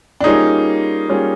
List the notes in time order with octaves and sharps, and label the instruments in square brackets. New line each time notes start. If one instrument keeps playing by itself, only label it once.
[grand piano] D4
[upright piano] G3 A#3 C#4 F4 G#4 [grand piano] D#4
[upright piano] G3 A#3 C#4 F4 G#4